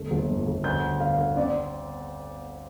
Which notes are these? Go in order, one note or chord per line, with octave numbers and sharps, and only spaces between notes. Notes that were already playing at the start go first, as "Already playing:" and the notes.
Already playing: G1 A3
G1
F2
G1
D2 G6
D3
D3 F5
D3
C4 D5